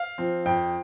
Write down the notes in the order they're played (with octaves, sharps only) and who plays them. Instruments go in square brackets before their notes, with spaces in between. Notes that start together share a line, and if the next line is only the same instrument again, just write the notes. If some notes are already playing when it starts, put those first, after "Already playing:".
Already playing: [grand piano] F5
F3 C4
F2 G5